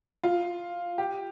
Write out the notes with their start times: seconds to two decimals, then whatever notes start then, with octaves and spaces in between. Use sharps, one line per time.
0.23 F4
0.98 G4